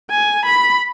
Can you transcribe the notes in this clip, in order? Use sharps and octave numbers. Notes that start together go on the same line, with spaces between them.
G#5
B5